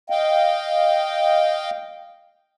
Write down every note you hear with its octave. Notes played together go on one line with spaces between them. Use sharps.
D#5 F5 G5